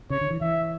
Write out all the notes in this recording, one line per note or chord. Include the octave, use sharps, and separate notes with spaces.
C#3 C#5
D3
E3
E3 E5